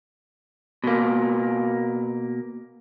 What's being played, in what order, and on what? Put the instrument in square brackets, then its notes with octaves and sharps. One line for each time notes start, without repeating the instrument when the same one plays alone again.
[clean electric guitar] B2 A#3